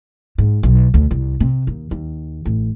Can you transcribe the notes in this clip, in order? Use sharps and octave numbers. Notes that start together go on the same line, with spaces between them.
G#2
B1
D2
C2
C3
D#2
D#2
A1